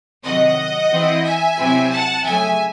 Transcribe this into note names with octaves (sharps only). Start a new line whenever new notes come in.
C3 D#3 F#3 D#5 F#5
E3 C4 E4
E5 G#5
C3 F#3 C4 E4
F#5 A5
C#3 F#3 A3 E5 G#5